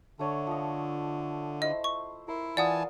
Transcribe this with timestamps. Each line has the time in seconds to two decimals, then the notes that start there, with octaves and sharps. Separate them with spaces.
0.19 D3 A3 C#5
0.47 F3 D#5
1.62 E4 C5 D#5
1.84 C#6
2.28 E4 A#4 C6
2.57 E3 F4 D5 F#5 G#5 A5 D#6